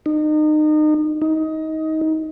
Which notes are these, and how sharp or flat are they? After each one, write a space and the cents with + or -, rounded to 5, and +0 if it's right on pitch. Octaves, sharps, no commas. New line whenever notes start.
D#4 -30
D#4 +20